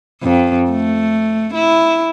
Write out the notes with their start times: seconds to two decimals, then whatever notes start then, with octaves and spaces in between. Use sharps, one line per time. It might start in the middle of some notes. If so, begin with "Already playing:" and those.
0.23 F2
0.71 A3
1.55 E4